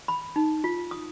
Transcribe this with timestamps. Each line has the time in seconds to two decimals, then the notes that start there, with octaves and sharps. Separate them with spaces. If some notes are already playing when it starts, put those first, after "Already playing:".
0.08 B5
0.36 D#4
0.64 F4
0.91 D#6